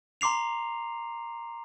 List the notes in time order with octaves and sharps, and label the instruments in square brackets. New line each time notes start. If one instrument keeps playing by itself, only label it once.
[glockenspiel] A#5 C6 D6 C7 F7